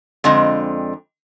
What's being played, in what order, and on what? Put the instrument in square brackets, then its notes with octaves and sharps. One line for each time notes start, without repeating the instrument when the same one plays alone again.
[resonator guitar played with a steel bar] F2 D3 G#3 C4 D#5